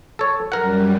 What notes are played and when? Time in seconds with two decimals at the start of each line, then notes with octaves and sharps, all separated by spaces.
0.19 A4 C#5
0.52 F#2 G3 A#4 F#5